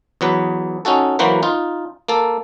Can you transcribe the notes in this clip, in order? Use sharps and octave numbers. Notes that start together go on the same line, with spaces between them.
E2 F#3 B4
C#4 D#4 F#4 A4
E3 F#3 A#3 F#4 B4 C5
D#4 F4
A#3 A4